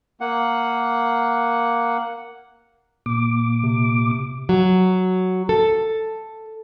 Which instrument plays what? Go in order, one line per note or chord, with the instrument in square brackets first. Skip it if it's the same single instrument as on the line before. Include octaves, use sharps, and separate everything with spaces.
[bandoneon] A#3 F#5
[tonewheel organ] A#2 D6
[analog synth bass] C3
[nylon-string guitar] F#3
A4